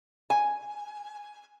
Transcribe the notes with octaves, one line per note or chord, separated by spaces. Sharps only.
G#5